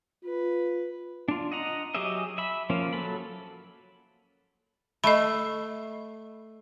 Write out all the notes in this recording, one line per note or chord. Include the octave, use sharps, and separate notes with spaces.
F4 B4
D4 F4
D#5 F#5 A#5
F#3 G4 G#4 D#5 E5
E5 B5
F3 A#3 C#4
F#3 A4 B5
A3 D#5 B5